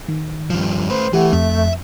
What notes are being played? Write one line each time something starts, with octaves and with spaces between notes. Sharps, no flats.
D#3
G2 F3
A3 B4 C5
E3 A3 G4 F#5
F2 E5